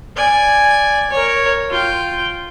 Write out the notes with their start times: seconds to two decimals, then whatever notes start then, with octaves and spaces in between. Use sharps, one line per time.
0.16 D5 G#5
1.10 A#4 C#5
1.70 F4 G5